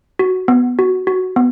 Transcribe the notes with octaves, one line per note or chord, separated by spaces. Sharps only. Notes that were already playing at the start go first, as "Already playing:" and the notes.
F#4
B3
F#4
F#4
B3